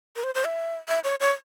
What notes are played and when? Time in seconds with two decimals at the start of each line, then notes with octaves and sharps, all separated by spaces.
0.16 A#4
0.24 C5
0.35 C5
0.46 E5
0.88 E5
1.04 C#5
1.20 C#5